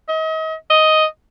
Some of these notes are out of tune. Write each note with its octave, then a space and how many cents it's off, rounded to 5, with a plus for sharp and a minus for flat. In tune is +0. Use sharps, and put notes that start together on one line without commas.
D#5 +40
D#5 +5